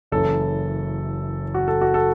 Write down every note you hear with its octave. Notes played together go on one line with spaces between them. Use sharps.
F#1 F#2 E3 A4
F#4
A4
F#4
A4